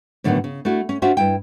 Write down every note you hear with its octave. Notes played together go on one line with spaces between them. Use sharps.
A2 D3 D#3 F#3 A#3 B3
C#3
A3 D4 E4 F#4
C#4
C#4 D4 F4 F#4 C5 E5
G2 E4 G5